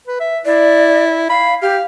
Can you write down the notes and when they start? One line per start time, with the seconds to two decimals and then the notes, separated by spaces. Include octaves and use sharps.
0.07 B4
0.20 E5
0.45 E4 D5
1.30 F5 B5
1.62 G4 F5